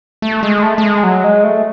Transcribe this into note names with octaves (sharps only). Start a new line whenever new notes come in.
A3
G#3
A3
A3
G#3
F#3
G#3
A3